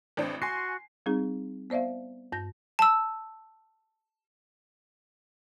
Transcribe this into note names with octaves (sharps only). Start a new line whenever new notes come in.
A1 C4 D4
F#4 G#5 C6 C7
G3 C4 D#4 G#4
B3 C5 D5 E5 F5
G2 G6 A#6
A5 E6